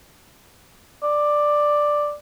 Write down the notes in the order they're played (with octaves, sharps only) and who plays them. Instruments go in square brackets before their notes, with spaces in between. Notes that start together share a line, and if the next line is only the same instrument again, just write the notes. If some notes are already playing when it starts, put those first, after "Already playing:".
[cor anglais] D5